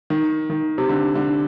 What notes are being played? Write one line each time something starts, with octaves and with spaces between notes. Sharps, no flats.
D#3
D#3
C3
D3
D3